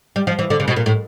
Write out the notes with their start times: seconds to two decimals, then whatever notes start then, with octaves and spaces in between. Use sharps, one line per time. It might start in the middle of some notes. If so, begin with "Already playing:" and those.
0.16 G3
0.27 F3
0.39 E3
0.50 D3
0.60 C#3
0.68 B2
0.76 A#2
0.86 A2